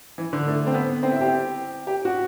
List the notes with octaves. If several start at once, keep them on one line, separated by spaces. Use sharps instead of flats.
E3
D3
A3
C4
B3
C4
E4
G4
G4
F#4